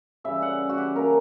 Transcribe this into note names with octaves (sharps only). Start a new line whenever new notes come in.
C#3 E3 G3 E5
F#5
F#4
G4
D3 F#3 A#3 C#4 A#4